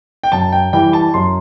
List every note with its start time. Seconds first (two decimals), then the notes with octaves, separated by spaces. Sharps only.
0.23 G5
0.32 F#2 A5
0.52 G5
0.73 E3 G3 G5
0.93 A5
1.14 F#2 C6